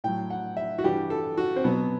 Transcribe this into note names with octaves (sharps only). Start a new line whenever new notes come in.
A2 F#3 G5
F#5
E5
F#4
G2 E3 G3 G4
A4
F#4
C4
B2 F#3 B3